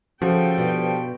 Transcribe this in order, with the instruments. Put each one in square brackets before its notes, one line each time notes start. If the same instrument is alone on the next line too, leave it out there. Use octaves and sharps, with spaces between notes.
[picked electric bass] C#3 [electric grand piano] F3 [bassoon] F#4 [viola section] A4 G5
[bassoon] G2 [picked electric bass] B2